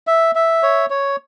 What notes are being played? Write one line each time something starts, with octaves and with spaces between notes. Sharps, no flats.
E5
E5
C#5
C#5